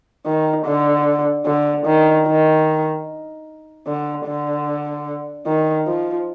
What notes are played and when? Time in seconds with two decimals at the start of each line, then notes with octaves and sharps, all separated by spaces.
0.26 D#3
0.66 D3
1.46 D3
1.86 D#3
2.27 D#3
3.87 D3
4.26 D3
5.46 D#3
5.87 F3